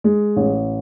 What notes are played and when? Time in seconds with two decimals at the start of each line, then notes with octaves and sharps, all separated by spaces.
0.04 G#3
0.36 A1